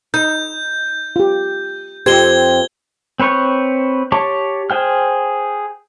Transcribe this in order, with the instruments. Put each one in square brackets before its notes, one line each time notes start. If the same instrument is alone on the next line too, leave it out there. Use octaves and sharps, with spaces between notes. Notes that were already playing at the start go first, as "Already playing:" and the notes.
[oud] D#4 [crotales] G6
[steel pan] F4 G4
[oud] F2 C4 [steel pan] G4 [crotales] G#6 G7
[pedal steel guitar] C4 B4 C#5 C#6 G6
G4 C#5 A5 C#6 D6
G#4 C5 G5 F6